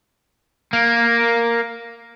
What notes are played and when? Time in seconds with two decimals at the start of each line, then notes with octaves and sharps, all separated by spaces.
0.73 A#3